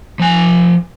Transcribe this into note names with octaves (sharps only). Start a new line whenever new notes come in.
F3 G#5